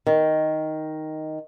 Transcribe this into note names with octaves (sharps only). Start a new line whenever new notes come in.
D#3